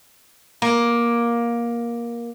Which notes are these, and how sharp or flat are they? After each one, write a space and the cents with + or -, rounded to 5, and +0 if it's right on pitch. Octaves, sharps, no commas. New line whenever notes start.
A#3 +15